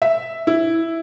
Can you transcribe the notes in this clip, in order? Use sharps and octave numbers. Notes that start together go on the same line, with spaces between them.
E5
E4